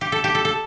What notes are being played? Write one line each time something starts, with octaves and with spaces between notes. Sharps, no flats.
G4
A4
G4
A4
A4